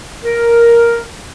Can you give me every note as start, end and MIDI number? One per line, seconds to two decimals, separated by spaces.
0.25 1.02 70